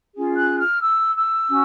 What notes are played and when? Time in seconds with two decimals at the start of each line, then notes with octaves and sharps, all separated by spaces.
0.14 C#4 F4 G#4
0.36 F#6
0.58 F6
0.82 E6
1.15 E6
1.49 C#4 F#4